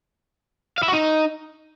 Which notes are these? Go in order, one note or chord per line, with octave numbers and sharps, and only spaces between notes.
F5
E4
F#4
D#4